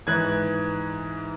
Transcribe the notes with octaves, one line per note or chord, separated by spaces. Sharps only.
G#2 E3 F#6 G#6